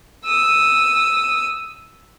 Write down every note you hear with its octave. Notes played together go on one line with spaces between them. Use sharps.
D#6 E6